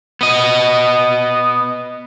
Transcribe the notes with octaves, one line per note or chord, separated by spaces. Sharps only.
B3 D#5